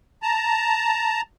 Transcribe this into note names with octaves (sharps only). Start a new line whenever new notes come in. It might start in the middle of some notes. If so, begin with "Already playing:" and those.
A5 A#5